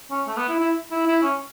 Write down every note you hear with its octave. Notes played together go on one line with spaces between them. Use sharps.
C#4
A3
B3
E4
E4
E4
E4
C#4